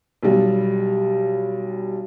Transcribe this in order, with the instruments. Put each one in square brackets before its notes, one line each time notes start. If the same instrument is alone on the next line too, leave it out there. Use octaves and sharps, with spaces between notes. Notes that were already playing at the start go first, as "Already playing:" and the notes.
[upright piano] B1 G3